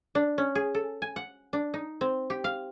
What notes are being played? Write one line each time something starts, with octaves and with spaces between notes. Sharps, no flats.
D4
C#4
G#4
A4
G#5
F#5
D4
D#4
C4
G4
F5